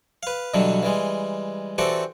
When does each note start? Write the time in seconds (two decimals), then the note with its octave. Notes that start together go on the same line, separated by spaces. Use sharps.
0.23 B4 F5
0.54 B2 D3 E3 F#3 G3
0.83 E3 G3 G#3
1.78 E3 C4 F#4 G4 A4 D5